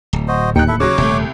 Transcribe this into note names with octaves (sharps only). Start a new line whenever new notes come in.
D1
F#4 C5 D#5
D#2 D#4 G5 F#6 C#7
E4 A4 E5
C#3 F#3 C#5 D6
D#1 C2 A3